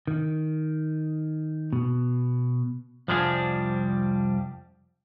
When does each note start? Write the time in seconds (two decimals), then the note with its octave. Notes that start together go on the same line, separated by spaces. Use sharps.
0.07 D#3
1.73 B2
3.08 C2 F2 F3 G3 D4 G#4